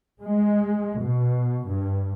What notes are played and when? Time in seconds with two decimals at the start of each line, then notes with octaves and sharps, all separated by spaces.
0.22 G#3
1.00 B2
1.68 G2